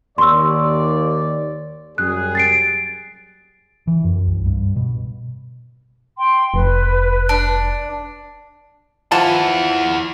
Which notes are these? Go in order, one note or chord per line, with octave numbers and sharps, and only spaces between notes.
D#2 D5 C6 C#6 E6
F#2 G3 G#4 F#6
A6 C7 D7
E3
F#2
C2
G2
B2
G5 C6
F1 B4
D4
E3 F3 E4 F#5 A5